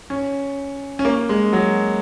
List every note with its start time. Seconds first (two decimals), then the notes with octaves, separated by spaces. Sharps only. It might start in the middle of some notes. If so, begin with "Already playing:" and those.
0.10 C#4
0.99 C#4
1.05 A#3
1.29 G#3
1.53 F#3